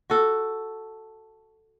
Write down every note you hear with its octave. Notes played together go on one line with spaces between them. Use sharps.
F#4 A4